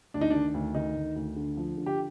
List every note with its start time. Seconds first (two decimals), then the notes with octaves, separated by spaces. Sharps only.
0.14 D2 D4
0.21 D#4
0.30 D#3 D4
0.54 D2
0.75 D#3 D#4
0.95 D2
1.16 D2
1.36 D3
1.57 F3
1.77 D3
1.86 G4